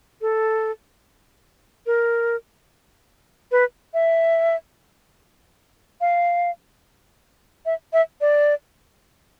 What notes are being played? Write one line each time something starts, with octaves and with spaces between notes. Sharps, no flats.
A4
A#4
B4
E5
F5
E5
E5
D5